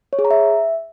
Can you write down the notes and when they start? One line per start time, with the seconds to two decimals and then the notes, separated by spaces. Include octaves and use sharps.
0.13 C#5
0.19 G#4
0.25 A#5
0.31 E5